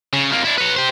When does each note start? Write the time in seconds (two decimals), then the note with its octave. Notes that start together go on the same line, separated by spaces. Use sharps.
0.13 C#3
0.32 F2 A#3
0.45 D4 E4
0.58 B4 C#5
0.77 G4 C5